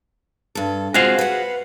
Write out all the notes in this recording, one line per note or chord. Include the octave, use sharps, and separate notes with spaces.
G2 A4
G#3 C4 F4 F#4 G#4 F5
B4 F#5